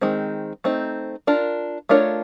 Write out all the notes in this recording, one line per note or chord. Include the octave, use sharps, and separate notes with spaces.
D#3 G#3 C4
A3 C4 D#4
D4 F4 A#4
A3 D4 F4 A#4 C#5